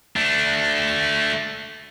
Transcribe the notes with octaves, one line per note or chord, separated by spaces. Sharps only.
A3 D4